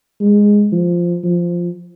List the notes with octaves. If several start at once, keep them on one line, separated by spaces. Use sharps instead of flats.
G#3
F3
F3